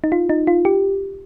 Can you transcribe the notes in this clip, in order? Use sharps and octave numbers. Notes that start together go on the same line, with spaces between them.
D#4
F4
D#4
F4
G4